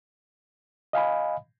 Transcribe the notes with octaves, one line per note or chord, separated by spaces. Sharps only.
D#5 F5 G#5 B5